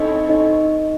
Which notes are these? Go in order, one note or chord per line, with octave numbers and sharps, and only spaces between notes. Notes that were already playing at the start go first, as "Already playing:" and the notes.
Already playing: C4 D#4 E4 A4 C#5 D#5
D#4 D#5